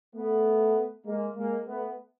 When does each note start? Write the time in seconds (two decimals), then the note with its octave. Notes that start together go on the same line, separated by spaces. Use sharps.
0.15 A3 B3
1.06 G#3 A#3
1.36 G#3 A#3
1.67 A3 B3